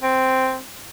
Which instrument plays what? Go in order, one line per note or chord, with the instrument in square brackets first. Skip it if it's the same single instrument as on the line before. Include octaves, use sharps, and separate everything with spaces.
[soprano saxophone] C4